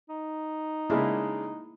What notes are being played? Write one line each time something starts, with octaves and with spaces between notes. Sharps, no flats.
D#4
C#3 G#3 A#3 D4 E4